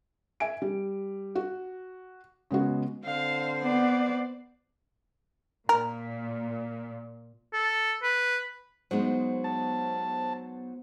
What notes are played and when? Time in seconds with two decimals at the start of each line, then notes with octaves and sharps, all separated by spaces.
0.40 E5 G#5 D7
0.62 G3
1.35 F#4
2.51 C#3 G#3 B3 F#4
3.04 D3 C4 C5 F5
3.63 B3 D5
5.69 A#2 A#4
7.53 A4
8.03 B4
8.91 F#3 G#3 B3 D#4 C5
9.44 A5